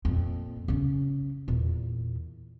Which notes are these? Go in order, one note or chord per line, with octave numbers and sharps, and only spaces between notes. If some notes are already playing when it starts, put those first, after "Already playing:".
F2 A#2
C#3 C#4
E2 A#2